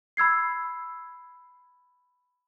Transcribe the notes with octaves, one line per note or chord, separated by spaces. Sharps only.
B5 E6 G#6 C7